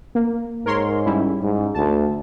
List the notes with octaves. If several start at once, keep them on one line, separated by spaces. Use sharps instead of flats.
A#3
G#2 A#4 C#5 C6
G3 C#4 E4
G#2
D2 A5